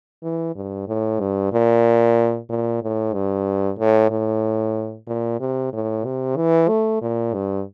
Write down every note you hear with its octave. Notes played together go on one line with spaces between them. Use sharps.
E3
G2
A2
G2
A#2
A#2
A2
G2
A2
A2
A#2
C3
A2
C3
E3
A3
A#2
G2